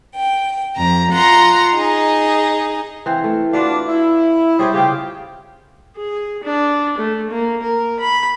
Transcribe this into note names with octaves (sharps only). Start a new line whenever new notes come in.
G5
F2 A#5
F4 F#5 A#5 C6
D#4 G#4
E3 C4 F5
A3
D4 F4 F#4 B4 F5
E4
G3 E4 G4 G#4 C5 C#5
C#3 C4 F4 G4
G#4
D4
A3
A#3
A#4
B5